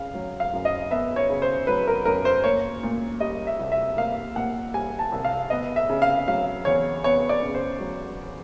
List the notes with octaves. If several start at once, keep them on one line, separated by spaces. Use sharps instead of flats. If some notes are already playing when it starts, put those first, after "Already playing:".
Already playing: C#3 F5
F#3
F5
F#2
D#5
B3 E5
C#5
C#3
C5
F#3 B4
A#4
F#2 A#4
C5
A#3 C#5
A#2
G3 D#5
E5
C2
E5
A#3 F5
A#2 F#5
G3 G#5
A5
C2
F5
B3 D#5
E5
C#3
F5
F#3 F5
E2 C#5
B3 C#5
D5
C#3
C5
F#3